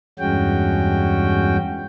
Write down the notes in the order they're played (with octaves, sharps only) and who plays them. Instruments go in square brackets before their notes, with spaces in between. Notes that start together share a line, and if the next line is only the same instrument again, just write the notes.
[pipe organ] E2 G2 G#3 C#4 F#4 G5